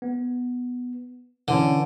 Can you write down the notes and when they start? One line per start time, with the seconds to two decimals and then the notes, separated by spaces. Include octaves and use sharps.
0.02 B3
1.48 D3 E3 C#4